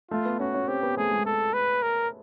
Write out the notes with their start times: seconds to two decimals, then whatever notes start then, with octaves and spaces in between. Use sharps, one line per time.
0.11 A3 F4
0.25 B3
0.40 C#4 F#4
0.54 C#4
0.68 C4 G4
0.83 B3
0.97 A3 G#4
1.11 G#3
1.26 A4
1.54 B4
1.82 A#4